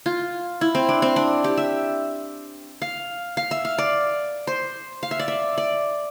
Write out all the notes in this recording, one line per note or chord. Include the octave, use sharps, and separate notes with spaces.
F4
E4
C4
D4
C4
D4
G4
E5
F5
F5
E5
F5
D5
C5
F5
E5
D5
E5
D5